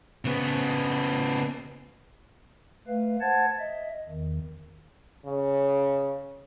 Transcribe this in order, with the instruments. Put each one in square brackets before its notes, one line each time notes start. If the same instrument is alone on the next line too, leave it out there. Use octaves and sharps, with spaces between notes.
[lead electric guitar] C#3 B3
[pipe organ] A3 B4 F5
C5 F#5 A5 G#6 A6
D#5 E5
E2 D#3
[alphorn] C#3